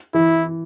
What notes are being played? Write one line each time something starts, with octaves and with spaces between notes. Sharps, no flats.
E3 E4